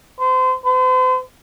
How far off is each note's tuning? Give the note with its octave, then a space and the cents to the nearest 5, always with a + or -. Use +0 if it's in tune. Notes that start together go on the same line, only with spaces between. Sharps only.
C5 -30
C5 -45